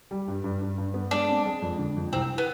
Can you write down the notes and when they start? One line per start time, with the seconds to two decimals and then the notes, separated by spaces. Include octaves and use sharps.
0.11 G3
0.28 G2
0.44 G2
0.62 G2
0.78 G2
0.94 B3
1.11 G#3 D4
1.28 C4
1.46 G#3
1.62 F2
1.79 D3
1.96 F2
2.13 C2 C4
2.38 B3